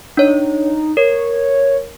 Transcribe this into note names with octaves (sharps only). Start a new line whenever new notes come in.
D4 D#4 C#5
A#4 C#5